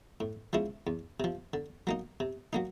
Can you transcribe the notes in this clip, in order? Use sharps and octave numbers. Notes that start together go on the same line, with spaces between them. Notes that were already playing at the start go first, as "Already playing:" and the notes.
A2
F3 G#3 C#4 E4
E2
C3 F3
D3
F#3 A#3 D#4
C3
F#3 A#3 D#4